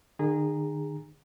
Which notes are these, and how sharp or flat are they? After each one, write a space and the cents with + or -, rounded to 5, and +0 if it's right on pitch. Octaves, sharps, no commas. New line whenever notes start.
D#3 -45 G#4 -20 A#5 +0